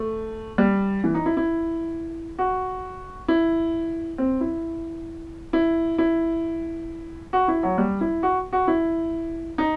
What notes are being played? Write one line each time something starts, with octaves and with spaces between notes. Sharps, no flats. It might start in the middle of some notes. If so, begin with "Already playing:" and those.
Already playing: A3
G3
E3
D#4
E4
E4
F#4
E4
C4
E4
E4
E4
F#4
E4
F#3
G3
E4
F#4
F#4
E4
D#4